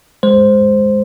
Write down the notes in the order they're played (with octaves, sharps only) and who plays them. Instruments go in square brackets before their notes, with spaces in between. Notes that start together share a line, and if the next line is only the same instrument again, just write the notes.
[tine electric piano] G#3 C5